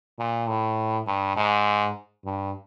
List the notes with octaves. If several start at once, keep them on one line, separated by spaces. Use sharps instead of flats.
A#2
A2
G2
G#2
G2